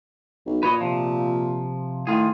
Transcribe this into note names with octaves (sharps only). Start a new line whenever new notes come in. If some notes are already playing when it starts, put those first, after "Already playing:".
B1
A#2 B4 C#5 D#5
C3 F3
A2 D#3 F4 G#4